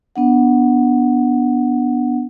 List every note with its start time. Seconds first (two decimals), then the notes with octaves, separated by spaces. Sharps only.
0.16 B3 D4 F#5